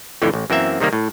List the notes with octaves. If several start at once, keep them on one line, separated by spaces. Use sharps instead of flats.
F2 A2 D3 E3
A1
F#2 E3 A#3 C4 E5
C3 D#3 G3 A#3
A2